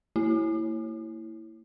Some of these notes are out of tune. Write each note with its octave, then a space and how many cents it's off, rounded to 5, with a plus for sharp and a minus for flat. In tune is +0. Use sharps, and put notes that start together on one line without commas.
A#3 -40 E4 +0